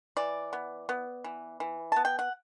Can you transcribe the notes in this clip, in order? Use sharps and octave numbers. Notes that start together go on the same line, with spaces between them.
E3 D5
B3
B3
E3
E3
B3 A5
G5
F#5